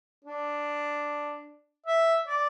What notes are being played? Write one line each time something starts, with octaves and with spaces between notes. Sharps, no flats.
D4
E5
D5